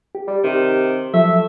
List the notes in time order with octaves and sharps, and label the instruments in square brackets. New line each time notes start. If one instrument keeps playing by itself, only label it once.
[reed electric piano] G4
[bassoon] G3
[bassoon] C3 [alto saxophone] D#3
[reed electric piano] F3 F#3 [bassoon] A3 [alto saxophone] E5